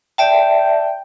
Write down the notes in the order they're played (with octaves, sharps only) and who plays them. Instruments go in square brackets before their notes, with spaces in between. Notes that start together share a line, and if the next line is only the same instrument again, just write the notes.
[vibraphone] D5 E5 A5 [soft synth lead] G5